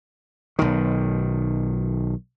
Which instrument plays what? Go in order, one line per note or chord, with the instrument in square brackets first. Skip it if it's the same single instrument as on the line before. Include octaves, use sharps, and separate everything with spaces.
[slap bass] B1 D#3